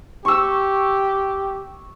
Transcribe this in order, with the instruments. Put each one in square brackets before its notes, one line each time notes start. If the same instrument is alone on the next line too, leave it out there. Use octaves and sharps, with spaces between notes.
[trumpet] G4 [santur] C#6 E6